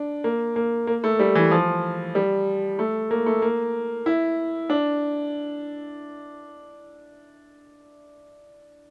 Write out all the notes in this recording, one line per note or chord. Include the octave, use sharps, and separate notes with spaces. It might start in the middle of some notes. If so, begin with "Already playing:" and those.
Already playing: D4
A#3
A#3
A#3
A3
G3
E3
F3
G3
A3
A#3
A3
A#3
E4
D4